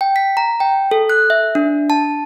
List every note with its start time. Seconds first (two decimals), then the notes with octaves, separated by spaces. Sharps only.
0.01 G5
0.16 B6
0.37 A#5
0.60 G5
0.91 A4
1.10 F#6
1.30 E5
1.55 D4
1.90 A5